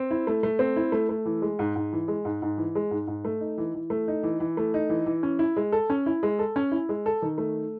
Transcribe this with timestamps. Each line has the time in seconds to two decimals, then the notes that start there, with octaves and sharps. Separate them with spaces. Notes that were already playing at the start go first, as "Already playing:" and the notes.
Already playing: C4
0.11 E4
0.27 A3
0.43 A3
0.59 C4
0.76 E4
0.92 A3
1.09 A3
1.26 E3
1.42 G#3
1.59 G#2
1.76 G#2
1.93 E3
2.08 G#3
2.25 G#2
2.42 G#2
2.58 E3
2.75 G#3
2.91 G#2
3.07 G#2
3.25 A3
3.40 D#4
3.58 E3
3.74 E3
3.90 A3
4.08 D#4
4.23 E3
4.40 E3
4.57 A3
4.74 D#4
4.89 E3
5.06 E3
5.23 C#4
5.39 E4
5.57 G#3
5.72 A4
5.90 C#4
6.06 E4
6.23 G#3
6.39 A4
6.56 C#4
6.72 E4
6.89 G#3
7.06 A4
7.22 D#3
7.38 A3